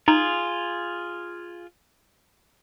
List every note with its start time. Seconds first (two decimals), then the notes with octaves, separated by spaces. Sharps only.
0.08 D#4 F4 G#4